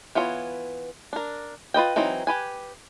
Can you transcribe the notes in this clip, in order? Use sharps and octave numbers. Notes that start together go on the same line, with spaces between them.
E3 B3 F4 G#4 C#5
D4 A#4
F4 B4 D#5 G5
E3 F#3 C4 D#4
G4 B4 G#5